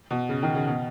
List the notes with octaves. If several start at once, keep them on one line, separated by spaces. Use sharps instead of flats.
B2
C#3
D#3
C#3
B2